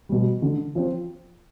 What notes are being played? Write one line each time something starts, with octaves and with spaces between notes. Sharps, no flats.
B2 G3
D3
F3 C4